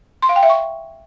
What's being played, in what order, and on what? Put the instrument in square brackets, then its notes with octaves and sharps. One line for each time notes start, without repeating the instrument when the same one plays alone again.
[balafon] C6
F5
G5
E5
C#6